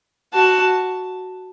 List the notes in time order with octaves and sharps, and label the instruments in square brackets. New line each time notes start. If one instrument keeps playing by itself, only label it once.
[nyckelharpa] F#4 [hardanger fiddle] A5